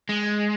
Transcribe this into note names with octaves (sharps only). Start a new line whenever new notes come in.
G#3